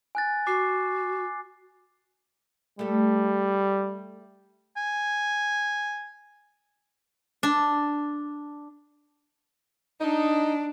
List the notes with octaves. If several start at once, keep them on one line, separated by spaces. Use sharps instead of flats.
G#5 F#6 A6
F#4 D6 C7
G3 A3 A4
G#5
D4
D4 D#4